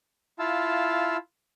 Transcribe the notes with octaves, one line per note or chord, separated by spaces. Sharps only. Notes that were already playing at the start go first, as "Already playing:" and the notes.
E4 F4 F5 A5 E6